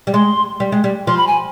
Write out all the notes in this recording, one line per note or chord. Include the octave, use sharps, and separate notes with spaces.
G3
G#3 C6
G3
G#3
G3
F3 C6
B5
G#5